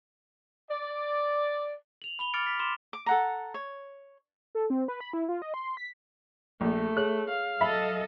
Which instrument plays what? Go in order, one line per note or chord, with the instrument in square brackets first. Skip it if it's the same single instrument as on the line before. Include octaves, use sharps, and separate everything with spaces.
[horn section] D5
[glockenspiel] F7 F#7
B5 F7 G7
D6 F6 A6 C#7 D7
B6
C6 D6 E7 G7
[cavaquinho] D6
A4 F#5 A#5
C#5
[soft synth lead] A4
C4
B4
B5
E4
F4
D#5
C6
B6
[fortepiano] A#1 [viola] A3
[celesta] G#4 C#5 F#7 [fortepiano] F#6
[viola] F5
[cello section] F#3 A4 D#5 [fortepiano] E5 B5